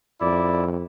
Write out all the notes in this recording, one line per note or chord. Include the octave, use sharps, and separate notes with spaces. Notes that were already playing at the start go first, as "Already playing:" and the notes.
F2 E4 D5